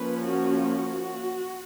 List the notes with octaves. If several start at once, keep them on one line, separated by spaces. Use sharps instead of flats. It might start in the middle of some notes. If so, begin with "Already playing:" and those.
Already playing: F3 A#3 C#4 B4
F#4
F#4